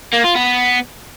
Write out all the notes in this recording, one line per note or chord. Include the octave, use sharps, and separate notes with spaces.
A#3
F4
B3